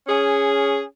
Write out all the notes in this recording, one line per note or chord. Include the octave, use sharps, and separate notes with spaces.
C#4 G#4